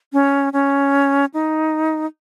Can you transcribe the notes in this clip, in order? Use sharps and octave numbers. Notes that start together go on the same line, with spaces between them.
C#4
C#4
D#4